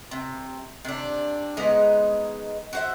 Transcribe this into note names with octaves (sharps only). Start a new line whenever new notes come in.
C3
C3 D4
G#3 B3 D#4 A#5
F#4 C5 E5